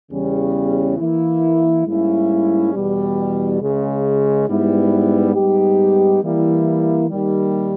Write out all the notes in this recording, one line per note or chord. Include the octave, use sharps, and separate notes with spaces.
E2 C#3 G3 C#4
E3 A#3 E4
G#2 G3 A#3 C#4 E4
E2 B2 G3
C#2 C#3 G#3
G#2 G3 B3 E4
G#2 G3 B3 D#4 G4
E3 G3 A#3 E4
D#2 D#3 G3